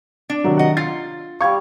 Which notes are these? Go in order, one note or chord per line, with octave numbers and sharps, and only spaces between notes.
D4
C3 D#3 F#3
D#5 F#5
F4 A6
G3 F5 C#6 G#6